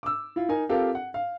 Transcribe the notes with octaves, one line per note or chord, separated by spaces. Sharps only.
D6 E6
E4 F4
D#4 A#4 G#5
C4 F4 G4 A4 A#4 F5
F#5
F5